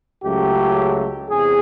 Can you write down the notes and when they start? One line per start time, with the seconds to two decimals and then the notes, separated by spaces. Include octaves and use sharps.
0.23 C#2 C#3 F#3 A3 G4
1.30 E2 C3 G#4